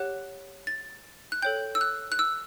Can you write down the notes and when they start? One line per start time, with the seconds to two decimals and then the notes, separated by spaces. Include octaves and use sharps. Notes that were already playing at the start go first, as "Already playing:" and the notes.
Already playing: G4 C#5 F#5 F#6
0.67 A6
1.32 F#6
1.42 A4 C#5 G5 G6
1.75 E6
1.81 F#6
2.12 F#6
2.19 E6